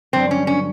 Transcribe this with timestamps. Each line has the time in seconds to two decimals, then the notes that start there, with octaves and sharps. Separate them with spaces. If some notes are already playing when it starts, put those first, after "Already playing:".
0.13 G2 D3 F#3 B3 C4 D4
0.31 C#4
0.47 C#4